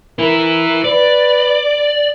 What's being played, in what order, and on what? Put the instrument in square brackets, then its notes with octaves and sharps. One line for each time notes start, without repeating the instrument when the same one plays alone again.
[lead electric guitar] E4 B4 [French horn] A#4
[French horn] B4 [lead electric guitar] D5